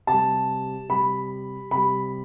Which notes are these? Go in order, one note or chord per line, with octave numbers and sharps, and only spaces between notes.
C3 G3 A5
C3 G3 B5
C3 G3 B5